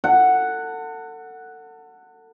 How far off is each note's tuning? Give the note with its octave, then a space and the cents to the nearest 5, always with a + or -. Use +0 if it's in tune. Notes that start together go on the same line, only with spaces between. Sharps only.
A4 +35 F#5 +0